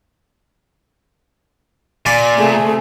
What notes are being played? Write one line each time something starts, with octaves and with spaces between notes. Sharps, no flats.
A#2 D5 G#5 C6
C3 A3 G#4